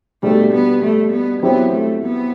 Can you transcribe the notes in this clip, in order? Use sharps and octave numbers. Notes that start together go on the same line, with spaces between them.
B2 G3 A3 D4 F#4
B3
A3
B3
F#3 B3 C4 E4 G4
A3
B3